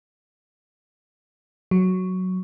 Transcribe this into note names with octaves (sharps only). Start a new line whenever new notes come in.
F#3